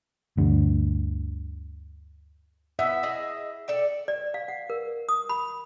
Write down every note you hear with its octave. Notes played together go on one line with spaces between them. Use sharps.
D2 G2
B3 E5
G#4 D#5
A4 D5 G5
D5
F5
F#5
A#4
D#6
B5